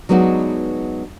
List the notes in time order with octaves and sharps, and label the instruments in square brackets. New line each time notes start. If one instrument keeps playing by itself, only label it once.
[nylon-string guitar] F#3 G#3 B3 D4 D#4 F#4